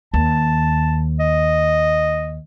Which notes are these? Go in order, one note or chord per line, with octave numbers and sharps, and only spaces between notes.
D#2 A5
D#5